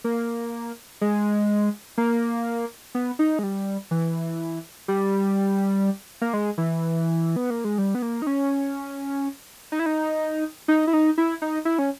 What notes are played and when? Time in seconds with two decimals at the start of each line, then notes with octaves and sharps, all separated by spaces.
0.04 A#3
1.01 G#3
1.98 A#3
2.95 B3
3.19 D#4
3.39 G#3
3.43 G3
3.91 E3
4.88 G3
6.21 A#3
6.33 G#3
6.58 E3
7.36 B3
7.50 A#3
7.64 G#3
7.78 G3
7.95 B3
8.02 A#3
8.22 D#4
8.27 C#4
9.72 D#4
9.79 E4
9.86 D#4
10.68 D#4
10.87 E4
10.93 D#4
11.18 E4
11.42 D#4
11.65 E4
11.79 C#4